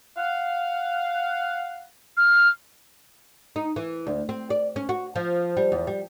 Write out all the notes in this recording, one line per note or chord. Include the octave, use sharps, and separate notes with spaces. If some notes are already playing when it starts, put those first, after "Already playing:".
F5 F#5
F6
D#4
E3
D2
C4
D5
C#4
F#4
F3
G3
E2
G3